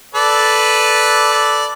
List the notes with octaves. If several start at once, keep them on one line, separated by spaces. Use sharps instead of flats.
A4 B4 D5